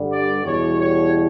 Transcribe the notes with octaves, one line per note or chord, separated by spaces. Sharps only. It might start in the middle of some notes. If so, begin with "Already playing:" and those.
Already playing: G2 D3 G3
D5
E2 B2 G3 C#5
C#5